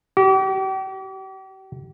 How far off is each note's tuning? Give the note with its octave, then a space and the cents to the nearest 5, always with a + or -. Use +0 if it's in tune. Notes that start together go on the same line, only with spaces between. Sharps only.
G4 -40